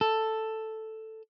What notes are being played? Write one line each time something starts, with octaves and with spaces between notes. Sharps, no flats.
A4